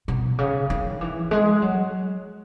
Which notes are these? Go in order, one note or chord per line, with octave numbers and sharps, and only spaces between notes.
B2
C#3
D#3
E3
G#3
F#3